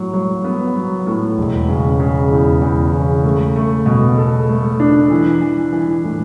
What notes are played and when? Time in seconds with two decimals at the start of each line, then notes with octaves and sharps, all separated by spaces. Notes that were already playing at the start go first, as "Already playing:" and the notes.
Already playing: A2 F#3
0.14 F#3
0.44 B3
0.76 F#3
1.07 A2
1.38 E1
1.68 C#3
2.00 C#3
2.31 E2
2.62 E2
2.93 C#3
3.24 A3
3.56 A3
3.86 B2
4.18 A4
4.49 A3
4.80 D4
5.10 E3
5.41 E3
5.73 E3
6.04 A2